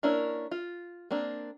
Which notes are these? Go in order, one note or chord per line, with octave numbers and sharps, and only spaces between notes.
A#3 C#4 D4 E4 A#4
F4
A#3 C4 D4